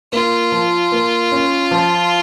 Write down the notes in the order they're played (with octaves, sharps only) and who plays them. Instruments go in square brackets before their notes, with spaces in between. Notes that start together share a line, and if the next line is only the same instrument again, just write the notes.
[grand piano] A#3 [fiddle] F4
[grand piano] F3
A#3
C#4
F3